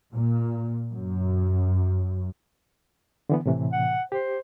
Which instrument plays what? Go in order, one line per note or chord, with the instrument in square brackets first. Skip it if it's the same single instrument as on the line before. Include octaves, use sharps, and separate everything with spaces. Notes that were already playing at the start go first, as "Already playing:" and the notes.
[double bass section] A#2
F#2
[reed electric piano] D3 E3 B3
A2 C3 E3
[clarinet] F#5
[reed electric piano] G4 [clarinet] C5